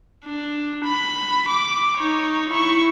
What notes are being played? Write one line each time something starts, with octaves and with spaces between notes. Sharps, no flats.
D4
B5
D6
D#4 C#5
E4 C#6